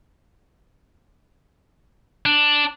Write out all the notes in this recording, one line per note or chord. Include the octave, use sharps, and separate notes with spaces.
D4